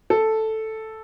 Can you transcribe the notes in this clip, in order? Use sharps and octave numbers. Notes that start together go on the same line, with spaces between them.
A4